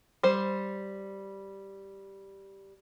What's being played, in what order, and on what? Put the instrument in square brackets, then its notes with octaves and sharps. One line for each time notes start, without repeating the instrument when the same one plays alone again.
[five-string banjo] G3 C5